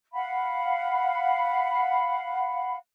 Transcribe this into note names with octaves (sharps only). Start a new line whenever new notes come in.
F5 F#5 B5